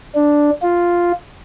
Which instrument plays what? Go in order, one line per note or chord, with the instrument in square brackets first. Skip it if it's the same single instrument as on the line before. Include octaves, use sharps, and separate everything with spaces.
[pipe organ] D4
F4